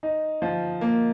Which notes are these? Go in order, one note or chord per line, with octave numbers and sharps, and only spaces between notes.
D#4
F3
A#3